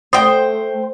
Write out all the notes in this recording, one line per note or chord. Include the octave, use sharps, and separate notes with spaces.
A3 C5 G5 D#6